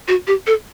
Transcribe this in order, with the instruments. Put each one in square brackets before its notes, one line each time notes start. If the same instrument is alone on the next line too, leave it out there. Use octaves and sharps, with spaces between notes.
[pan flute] F#4
G4
A4